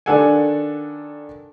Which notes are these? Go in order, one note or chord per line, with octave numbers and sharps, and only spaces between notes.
D#3 D4 A4 F#5 G#5